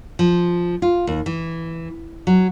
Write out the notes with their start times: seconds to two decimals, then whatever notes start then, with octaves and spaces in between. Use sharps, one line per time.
0.19 F3
0.82 F4
1.07 D#2
1.26 E3
2.27 F#3